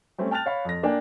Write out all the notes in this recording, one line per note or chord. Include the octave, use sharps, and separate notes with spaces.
G3 A3 C4 C#4
G5 A5 F6 F#6 A6 F7
C#5 F5 B5
F2 A#6
A#3 D4 D5 G5 G#5